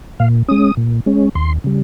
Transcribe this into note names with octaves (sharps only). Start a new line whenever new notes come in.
A#2 F5
G#3 C#4 D#6
A#2
G#3 C#4
D#2 C6
C#3 G3